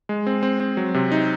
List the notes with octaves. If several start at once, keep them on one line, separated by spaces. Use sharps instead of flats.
G#3
C4
C4
C4
F#3
C3
D#4